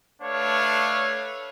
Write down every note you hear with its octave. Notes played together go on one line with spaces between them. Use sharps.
A3 D4 B4 C#5 F5